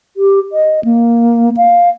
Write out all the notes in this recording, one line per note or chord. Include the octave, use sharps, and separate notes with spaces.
G4
D#5
A#3
F5